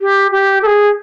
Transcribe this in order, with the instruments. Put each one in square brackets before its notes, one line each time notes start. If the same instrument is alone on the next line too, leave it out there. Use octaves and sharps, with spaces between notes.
[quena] G4
G4
A4
G#4